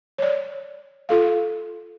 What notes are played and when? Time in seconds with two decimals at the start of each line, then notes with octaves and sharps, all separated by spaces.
0.18 C#5 D5
1.09 F4 A4 F5